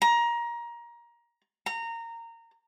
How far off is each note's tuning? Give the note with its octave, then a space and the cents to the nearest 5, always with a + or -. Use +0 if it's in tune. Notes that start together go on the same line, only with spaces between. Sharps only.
A#5 +20
A#5 -20